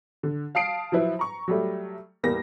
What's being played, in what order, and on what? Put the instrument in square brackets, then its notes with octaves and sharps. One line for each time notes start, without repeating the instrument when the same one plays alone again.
[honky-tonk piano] D3
F5 A5 D#6 C7 D7
F3 F#3 E4 B4
A#5 C#6
F#3 G3 A3
E2 G3 A#3 A#6